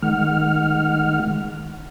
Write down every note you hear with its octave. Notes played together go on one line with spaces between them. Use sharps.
D#3 G#3 F#5 F6